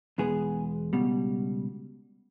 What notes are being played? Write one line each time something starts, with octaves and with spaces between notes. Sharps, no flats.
E2 B2 G#3 B3 G#4
C#2 B2 G3